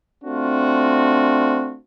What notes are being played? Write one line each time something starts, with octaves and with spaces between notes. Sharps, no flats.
A3 C4 D4 F4 F#4